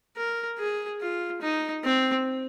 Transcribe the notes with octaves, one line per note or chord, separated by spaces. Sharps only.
A#4
G#4
F4
D#4
C4